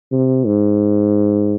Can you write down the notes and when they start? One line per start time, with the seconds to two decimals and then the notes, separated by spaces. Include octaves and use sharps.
0.12 C3
0.46 G#2